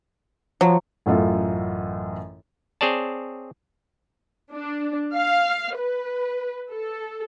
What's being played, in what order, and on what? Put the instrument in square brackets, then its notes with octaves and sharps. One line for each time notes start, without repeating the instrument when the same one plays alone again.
[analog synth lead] F3 [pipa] F#3
[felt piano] A1 F#2 F4 A4
[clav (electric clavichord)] C4 G#4 C#5 D5 A5
[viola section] D4
F5
B4
A4